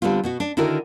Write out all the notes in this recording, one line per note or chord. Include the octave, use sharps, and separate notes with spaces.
D3 G3 B3 C4 F4
B2 B3 F#4
D4
D3 D#3 E4 F#4 A#4